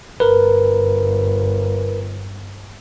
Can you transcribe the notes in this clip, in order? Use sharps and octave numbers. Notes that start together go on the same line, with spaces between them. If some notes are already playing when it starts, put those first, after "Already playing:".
G1 A#4 B4